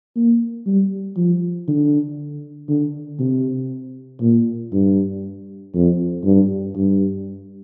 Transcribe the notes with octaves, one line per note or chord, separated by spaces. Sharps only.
A#3
G3
F3
D3
D3
C3
A#2
G2
F2
G2
G2